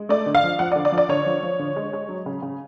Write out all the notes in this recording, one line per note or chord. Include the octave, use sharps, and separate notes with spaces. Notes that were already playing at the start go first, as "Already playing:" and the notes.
Already playing: G#3
A3 D5
D3
F5
F3
F3 F#5
D5
D3
D5
F3
D5
D3 C#5
F3
F3
D3
G#3
G#3
F#3
C#3
C#3